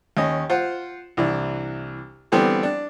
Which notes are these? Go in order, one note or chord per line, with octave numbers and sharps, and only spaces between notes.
D#2 C#4 D#5
F4 C5 F#5
C2 E3 D4
D3 E3 G3 B3 C4
D4